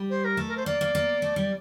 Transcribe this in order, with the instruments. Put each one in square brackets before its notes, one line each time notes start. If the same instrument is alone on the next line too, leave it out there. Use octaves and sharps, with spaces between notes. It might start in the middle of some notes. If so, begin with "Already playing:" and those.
Already playing: [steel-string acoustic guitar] G3
[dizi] C5
A#4
[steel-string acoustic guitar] A3
[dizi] A#4
C5
[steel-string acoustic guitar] A#3 [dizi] D5
[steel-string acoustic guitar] A#3
A#3
A3
G3